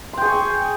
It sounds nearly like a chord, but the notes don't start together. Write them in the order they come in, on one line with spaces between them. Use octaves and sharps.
C6 G5 G#4 C#6